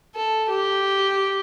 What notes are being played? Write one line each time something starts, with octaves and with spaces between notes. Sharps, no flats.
A4
G4